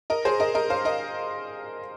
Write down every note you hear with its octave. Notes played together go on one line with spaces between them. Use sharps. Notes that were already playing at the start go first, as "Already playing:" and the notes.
A#4 D#5
G#4 C5
A#4 D#5
A#4 D#5
C5 F5
A#4 D#5